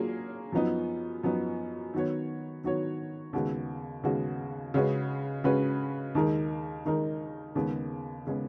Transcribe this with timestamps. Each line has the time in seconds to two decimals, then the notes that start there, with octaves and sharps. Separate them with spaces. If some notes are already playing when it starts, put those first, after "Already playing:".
Already playing: F#3 A#3 F4 G#4 C#5
0.52 F#2 F3 B3 D#4
1.24 F#2 F3 B3 D#4
1.94 D#3 F#3 B3 F#4 C#5
2.64 D#3 F#3 B3 F#4 C#5
3.33 D#2 C#3 G#3 B3 F#4
4.03 D#2 C#3 G#3 B3 F#4
4.74 C#3 G#3 C#4 F#4 B4
5.44 C#3 G#3 C#4 F#4 B4
6.15 D#2 D#3 G#3 D#4 A#4
6.85 D#2 D#3 G#3 D#4 A#4
7.55 D#2 C#3 G#3 B3
8.27 C#3 G#3 B3